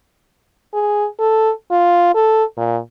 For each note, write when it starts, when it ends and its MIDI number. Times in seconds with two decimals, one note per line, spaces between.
0.74 1.07 68
1.20 1.51 69
1.71 2.14 65
2.15 2.44 69
2.57 2.78 46